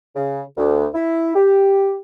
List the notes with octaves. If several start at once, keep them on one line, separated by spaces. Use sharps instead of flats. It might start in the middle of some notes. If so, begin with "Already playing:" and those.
C#3
D2
E4
G4